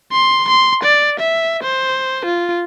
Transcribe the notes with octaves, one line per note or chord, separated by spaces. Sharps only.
C6
C6
D5
E5
C5
F4